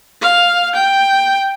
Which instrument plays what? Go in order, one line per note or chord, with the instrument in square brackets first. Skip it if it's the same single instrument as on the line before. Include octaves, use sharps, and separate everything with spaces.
[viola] F5
G5